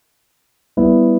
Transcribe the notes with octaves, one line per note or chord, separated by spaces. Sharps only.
G3 B3 E4